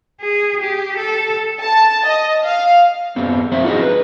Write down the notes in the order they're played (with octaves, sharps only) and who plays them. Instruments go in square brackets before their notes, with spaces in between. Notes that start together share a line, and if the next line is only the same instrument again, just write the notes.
[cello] G#4
G4
A4
[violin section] A5
D#5
F5
[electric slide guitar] F#2 B3 C4
F3 C4 C5 E5
D#4 E4 F#4 G#4 D#5
B4